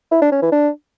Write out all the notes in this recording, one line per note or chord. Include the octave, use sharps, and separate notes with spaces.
E4
D4
C#4
E3
D4